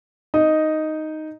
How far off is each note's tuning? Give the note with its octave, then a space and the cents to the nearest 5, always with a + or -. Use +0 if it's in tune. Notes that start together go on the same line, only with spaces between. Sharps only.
D#4 +0 D#5 +0